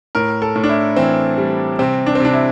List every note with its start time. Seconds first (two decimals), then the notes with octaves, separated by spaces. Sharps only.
0.15 A2 A#4
0.42 A4
0.55 A2
0.64 D4
0.69 E4
0.96 E3 C4
1.38 G3
1.79 C3 C4
2.06 D4
2.15 C4
2.20 C3 D4
2.33 E4